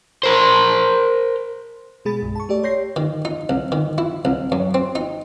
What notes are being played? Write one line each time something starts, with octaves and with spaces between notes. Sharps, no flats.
A#4 C5
B2 G#3 G#4 B5 A6
B1 G2
A5 C#6
A3 G4 D5
C#5 C6 G6 A#6 C7
D#3
D#4
C2
D#3
E4
C2
F#2
C4
D#4